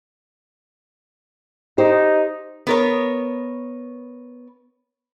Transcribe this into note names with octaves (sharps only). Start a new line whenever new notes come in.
D#4 G4 C5
B3 A#4 C#5